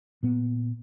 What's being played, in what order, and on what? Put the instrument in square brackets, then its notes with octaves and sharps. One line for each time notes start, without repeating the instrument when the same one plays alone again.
[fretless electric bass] A#2 B3